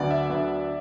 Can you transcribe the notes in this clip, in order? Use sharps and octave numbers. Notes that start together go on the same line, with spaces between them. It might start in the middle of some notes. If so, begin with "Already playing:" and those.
Already playing: D2 D3 F#3 B3 D5
E5
D2 D3 F#3 B3